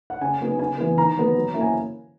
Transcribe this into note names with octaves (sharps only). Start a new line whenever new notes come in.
F#5
C#3 G#5
F#3 B3 D#4
C#3 G#5
E3 B3
D#3 A#5
F#3 B3
F#3
A#3 C#4 E4
G#5